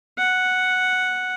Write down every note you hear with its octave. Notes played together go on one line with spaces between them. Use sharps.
F#5